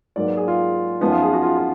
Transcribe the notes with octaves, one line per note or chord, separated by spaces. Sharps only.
G#2 F#3 A#3 D5
B4
G#4
F4
F#2 F3 B3 D#4
F4
G#4
F#4
F4
F4